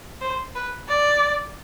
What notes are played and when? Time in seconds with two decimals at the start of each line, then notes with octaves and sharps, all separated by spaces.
0.21 C5
0.55 B4
0.89 D5